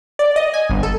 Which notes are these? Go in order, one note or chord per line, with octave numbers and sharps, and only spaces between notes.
D5
D#5
G#5
G1
A4